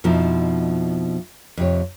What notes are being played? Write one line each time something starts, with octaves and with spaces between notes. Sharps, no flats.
F2 B2 F3 D#4 E4
F2 C3 C#5